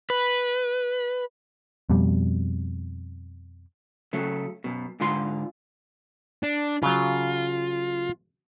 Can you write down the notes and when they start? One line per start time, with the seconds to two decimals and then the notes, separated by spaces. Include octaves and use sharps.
0.10 B4
1.90 F2 B2 G3
4.13 C#3 F#3 A3
4.64 F#2 B2
5.00 G#2 D3 F4 C6
6.43 D4
6.83 C#3 F#3 F4